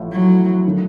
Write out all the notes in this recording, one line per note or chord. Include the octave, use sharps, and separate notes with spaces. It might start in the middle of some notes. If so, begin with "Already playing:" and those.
Already playing: A1 A2 F3
F#3
D#3 F#3 A3